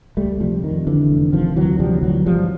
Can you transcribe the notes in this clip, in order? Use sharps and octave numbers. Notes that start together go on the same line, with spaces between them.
C#2 G3 A3
C3 F3 G3
F2 D#3
F1 D3 E3
F1
C3 D#3 F3
D2 E3 F#3
C3 F3 G3
D2 E3 F#3
G1 F3 G3